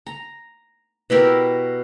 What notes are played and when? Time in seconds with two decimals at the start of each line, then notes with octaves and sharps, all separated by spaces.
0.06 A#5
1.10 B2 E4 G4 A#4